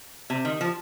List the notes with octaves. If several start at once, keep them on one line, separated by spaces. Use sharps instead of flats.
C3
D#3
F3